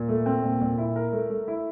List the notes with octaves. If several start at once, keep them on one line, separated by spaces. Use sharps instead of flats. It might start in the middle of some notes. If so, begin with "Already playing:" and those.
Already playing: A#2
A3
C4
A#2
A#2
E4
A#4
A3
A3
E4